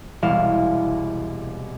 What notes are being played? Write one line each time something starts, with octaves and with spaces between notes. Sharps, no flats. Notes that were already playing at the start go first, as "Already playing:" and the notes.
E1 C2 E4 F5 E7